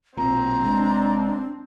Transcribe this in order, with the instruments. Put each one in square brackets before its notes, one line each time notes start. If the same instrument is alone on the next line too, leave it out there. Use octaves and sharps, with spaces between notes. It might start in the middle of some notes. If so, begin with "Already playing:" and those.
[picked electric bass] B1 A#2 [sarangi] C4 [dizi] A#5
[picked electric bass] F1 G#3 [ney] D4